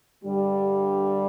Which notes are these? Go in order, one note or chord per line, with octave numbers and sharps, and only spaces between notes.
G2 D3 G3